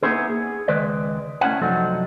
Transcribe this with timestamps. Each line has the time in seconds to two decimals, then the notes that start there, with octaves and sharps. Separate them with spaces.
0.03 A#3 B3 C#4 D#4 E4 G#4
0.30 G#4
0.68 C#2 D#3 G#3 B4 D5
1.41 A3 C#4 D4 E4 F#5
1.62 C2 F#2 F3 F#3 D#4 A4